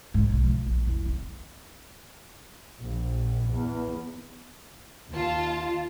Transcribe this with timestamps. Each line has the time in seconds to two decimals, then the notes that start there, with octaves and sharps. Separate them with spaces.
0.14 G#2
0.30 B1
0.43 F3
0.67 A#1
0.87 E2
1.05 C4
2.83 A#1
3.52 E2
5.13 D#2 F4 A5